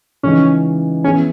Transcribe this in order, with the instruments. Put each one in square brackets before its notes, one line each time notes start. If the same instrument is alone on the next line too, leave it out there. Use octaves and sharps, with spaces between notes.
[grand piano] C#3 E3 G#3 D#4 [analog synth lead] C#4
[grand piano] E3 B3 E4 G#4 [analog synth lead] C#4